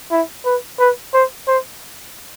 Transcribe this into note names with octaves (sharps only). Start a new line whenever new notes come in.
E4
B4
B4
C5
C5